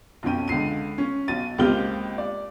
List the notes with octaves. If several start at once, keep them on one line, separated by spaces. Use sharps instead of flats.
B1 F2 C#4 G5 D#7
C#2 D3 C7 D#7
C#4
B1 B2 A6 D#7
C#2 A#3 C4 G4 F6 G7
D5